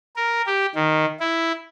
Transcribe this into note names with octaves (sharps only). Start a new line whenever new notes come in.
A#4
G4
D#3
E4